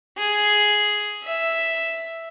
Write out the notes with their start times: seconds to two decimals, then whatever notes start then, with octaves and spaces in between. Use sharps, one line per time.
0.18 G#4
1.24 E5